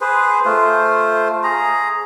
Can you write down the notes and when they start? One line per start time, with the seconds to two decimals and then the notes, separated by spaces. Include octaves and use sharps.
0.01 G#4 B4 C5
0.45 A3 F4 C5
1.44 G#4 A#5